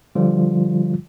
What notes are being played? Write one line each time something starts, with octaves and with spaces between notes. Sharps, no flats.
D3 F3 G3 F4